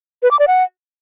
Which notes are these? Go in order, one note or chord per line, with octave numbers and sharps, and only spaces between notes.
B4
D6
D5
F#5